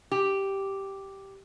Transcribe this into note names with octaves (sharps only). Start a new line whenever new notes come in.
G4